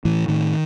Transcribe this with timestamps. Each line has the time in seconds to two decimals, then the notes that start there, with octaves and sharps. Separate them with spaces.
0.05 A2 E3
0.28 A2 D#3